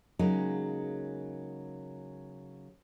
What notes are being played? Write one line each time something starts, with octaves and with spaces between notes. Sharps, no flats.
C#3 F#3 G#3 A#3 D#4